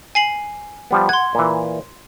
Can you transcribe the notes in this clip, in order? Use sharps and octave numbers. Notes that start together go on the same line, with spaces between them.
G#5 C7 F#7
F3 G3 B3
F#5 C6 G#6
A#2 E3